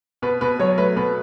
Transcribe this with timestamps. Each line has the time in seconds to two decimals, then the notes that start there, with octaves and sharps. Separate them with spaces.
0.22 B2 B4
0.41 B2 B4
0.60 F#3 C#5
0.78 A3 B4
0.96 B2 B4